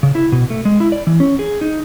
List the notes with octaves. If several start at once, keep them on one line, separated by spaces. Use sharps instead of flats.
C#3
E4
B2
A3
G#3
E4
D5
E3
C#4
G#4
D#4